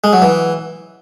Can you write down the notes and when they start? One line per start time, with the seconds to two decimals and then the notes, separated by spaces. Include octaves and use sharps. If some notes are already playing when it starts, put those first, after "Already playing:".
0.04 G#3
0.13 F#3
0.22 E3